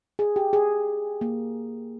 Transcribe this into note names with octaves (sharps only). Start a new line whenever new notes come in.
G#4
G4
G#4
A#3